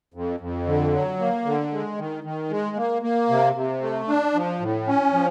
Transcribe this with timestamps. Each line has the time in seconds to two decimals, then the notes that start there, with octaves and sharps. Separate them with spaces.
0.14 F2
0.40 F2
0.66 D3
0.92 F#3
1.19 A#3
1.45 D3
1.72 G#3
1.97 D#3
2.24 D#3
2.50 G#3
2.76 A#3
3.02 A#3
3.29 C3
3.55 C3
3.82 A3
4.08 D4
4.34 F3
4.60 A2
4.87 C#4
5.13 F3